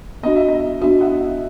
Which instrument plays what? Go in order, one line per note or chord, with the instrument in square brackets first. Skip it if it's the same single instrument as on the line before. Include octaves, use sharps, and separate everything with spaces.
[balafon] B3 D4 F#4 [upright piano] D#5
[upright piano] E5
D#5
[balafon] B3 D4 F#4 [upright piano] E5
[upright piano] E5 F#5
E5